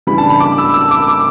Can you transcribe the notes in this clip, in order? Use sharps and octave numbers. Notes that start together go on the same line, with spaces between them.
C#3 E3 G3 D4 B5
A5
B5
D6
E6
E6
D6
D6